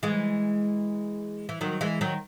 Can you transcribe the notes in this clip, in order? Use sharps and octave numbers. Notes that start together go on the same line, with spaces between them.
E3 G#3
E3
D#3 F#3
E3 G#3
D#3 F#3